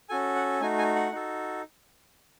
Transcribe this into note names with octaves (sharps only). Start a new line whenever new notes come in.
C#4 F#4 A4 G#5
F#5
A3 D#4 F#4 G#5
G#5
F#5
D#4 F#4 A4